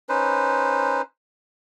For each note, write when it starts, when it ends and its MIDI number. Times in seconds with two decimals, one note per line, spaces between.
0.09 1.02 61
0.09 1.02 63
0.09 1.02 71
0.09 1.02 72